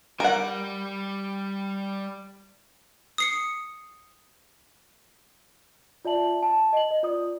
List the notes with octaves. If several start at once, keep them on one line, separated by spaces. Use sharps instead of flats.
G3 A#4 F#5
D#6 C7 C#7
F4 D5 E5 A5 F#7
A5
D#5 F#7
D#5
F4 D5 D#6